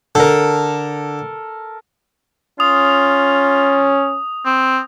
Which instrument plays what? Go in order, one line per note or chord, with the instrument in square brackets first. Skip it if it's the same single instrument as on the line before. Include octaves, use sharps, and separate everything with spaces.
[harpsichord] D3 [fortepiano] A4 A#4
[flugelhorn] C#4 [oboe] F4 [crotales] D#6
[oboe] C4